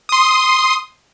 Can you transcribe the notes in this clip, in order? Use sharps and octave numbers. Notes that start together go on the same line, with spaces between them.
C6 D#6